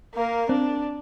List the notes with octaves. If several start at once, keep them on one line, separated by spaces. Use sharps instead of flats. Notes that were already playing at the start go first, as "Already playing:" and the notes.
A#3 A#4
C4 D4